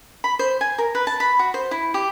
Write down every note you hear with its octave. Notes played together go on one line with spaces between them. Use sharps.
B5
C5
G#5
A#4
B4
A5
B5
F#4
C5
E4
G4